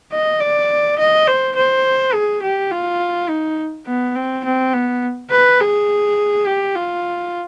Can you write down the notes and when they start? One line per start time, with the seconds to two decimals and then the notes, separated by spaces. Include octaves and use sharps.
0.12 D#5
0.40 D5
0.99 D#5
1.27 C5
1.56 C5
2.14 G#4
2.43 G4
2.71 F4
3.29 D#4
3.87 B3
4.16 C4
4.45 C4
4.74 B3
5.31 B4
5.61 G#4
6.47 G4
6.76 F4